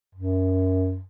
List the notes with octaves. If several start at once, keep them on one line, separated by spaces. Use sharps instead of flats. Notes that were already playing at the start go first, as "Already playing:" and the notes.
F#2